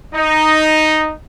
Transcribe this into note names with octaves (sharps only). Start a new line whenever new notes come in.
D#4